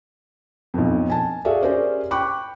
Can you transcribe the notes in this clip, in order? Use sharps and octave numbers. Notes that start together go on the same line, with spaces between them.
B1 F2
G#5 A5
F#4 G#4 A4 D5 E5 F5
C#4 G4 G#4 A#4 C5 D5
G5 B5 C#6 D6 F#6